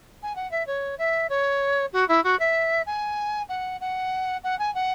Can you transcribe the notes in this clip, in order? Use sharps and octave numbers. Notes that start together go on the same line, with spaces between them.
G#5
F#5
E5
C#5
E5
C#5
F#4
E4
F#4
E5
G#5
F#5
F#5
F#5
G#5
F#5